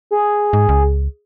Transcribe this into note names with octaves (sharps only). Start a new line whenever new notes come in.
G#4
G#2
C#2